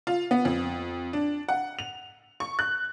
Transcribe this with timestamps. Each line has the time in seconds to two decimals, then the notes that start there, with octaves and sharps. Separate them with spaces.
0.07 F4
0.31 B3
0.45 F2
1.13 D4
1.49 F#5
1.79 F7
2.40 C#6
2.59 F#6